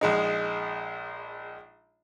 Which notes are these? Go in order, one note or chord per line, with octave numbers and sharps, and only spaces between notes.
A#1 G#3 D#4